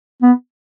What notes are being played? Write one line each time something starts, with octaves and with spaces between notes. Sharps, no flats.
B3